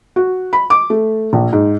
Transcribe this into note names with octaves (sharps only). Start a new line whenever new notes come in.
F#4
B5
D6
A3
A#1
G#2